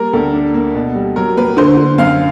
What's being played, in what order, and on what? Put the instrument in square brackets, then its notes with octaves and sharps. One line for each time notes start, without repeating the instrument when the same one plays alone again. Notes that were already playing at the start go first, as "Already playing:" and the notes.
Already playing: [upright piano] G3 A#3 A#4
D2 A4
D4
A#3
B2
G3
F#3 A#4
A#3 B4
D3 C5
D3
F#2 F5